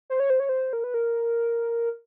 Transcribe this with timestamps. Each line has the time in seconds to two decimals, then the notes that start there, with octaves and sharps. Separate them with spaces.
0.10 C5
0.20 C#5
0.30 C5
0.40 C#5
0.49 C5
0.73 A#4
0.84 B4
0.94 A#4